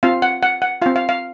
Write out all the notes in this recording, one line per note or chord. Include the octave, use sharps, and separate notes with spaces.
C4 F4 F5
F#5
F#5
F#5
C4 F4 F5
F5
F5